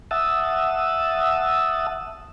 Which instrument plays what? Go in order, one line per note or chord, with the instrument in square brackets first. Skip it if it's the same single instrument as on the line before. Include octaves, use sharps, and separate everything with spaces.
[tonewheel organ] E5 F#5 A5 D#6 E6